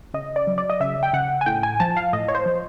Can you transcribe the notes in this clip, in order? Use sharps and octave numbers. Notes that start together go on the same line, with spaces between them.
C#3 D#5
D5
F#3
D5
D#5
C#3 E5
G5
C#3 F#5
G#5
A2 G5
G#5
F3 A5
F5
A2 D#5
C#5
C5
F3